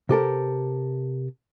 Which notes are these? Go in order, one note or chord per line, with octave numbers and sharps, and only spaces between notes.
C3 G4 A4 A#4